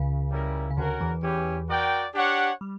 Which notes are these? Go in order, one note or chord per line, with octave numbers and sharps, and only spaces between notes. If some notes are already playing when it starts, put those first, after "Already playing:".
Already playing: C#2 C#3
G3 C#4 E4 A#4
C#3
D2 D3 C#4 F#4 A#4
E2 E3
E2 E3 C#4 E4 G4
F#4 A#4 D5 G5
D4 G4 C#5 F#5
G3